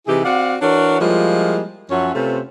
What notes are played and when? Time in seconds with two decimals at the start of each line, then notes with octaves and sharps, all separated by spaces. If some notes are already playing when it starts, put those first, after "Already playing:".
0.07 C3 E3 D#4 E4 G4 G#4
0.24 C4 F#4 D5 F5 F#5
0.62 E3 D4 F#4 A#4 C#5
0.99 F3 G3 G#3 A#3 E4 F4
1.90 F#2 F3 C#4 C#5 E5 F#5
2.15 C3 A3 C#4 F4 B4 C5